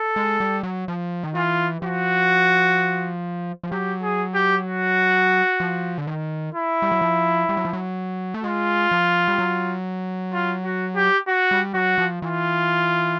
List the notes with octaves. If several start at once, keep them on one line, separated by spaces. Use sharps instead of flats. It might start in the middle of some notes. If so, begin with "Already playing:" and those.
Already playing: A4
G#3
G3
F#3
F3
D#3
E3 F4
F3 F#4
F3
F#3 G4
G#4
G4
F#4
F3
D3
D#3
E4
G3
F#3
F3
G3
F#3
F3
F#3
A3
G#3 F4
F3
G3
F#3
F4
F#4
G4
F#4
G3
F#3 F#4
F3
E3 F4